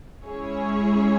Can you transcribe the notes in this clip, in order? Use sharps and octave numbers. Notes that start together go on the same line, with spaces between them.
G#3 C#4 E4 G#4 C#5